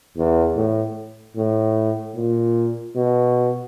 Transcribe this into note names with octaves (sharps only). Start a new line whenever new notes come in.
E2
A2
A2
A#2
B2